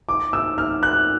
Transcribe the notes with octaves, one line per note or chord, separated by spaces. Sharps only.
D6
E6
F6
F#6